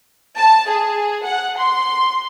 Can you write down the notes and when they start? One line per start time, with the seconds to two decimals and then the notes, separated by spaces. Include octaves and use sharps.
0.37 A5
0.69 G#4
1.25 F#5
1.58 C6